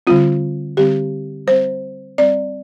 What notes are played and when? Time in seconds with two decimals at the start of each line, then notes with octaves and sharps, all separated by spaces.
0.07 D3 G3 C4 F4
0.77 D3 G3 C4 G4
1.47 G3 C4 C5
2.18 G3 C4 D5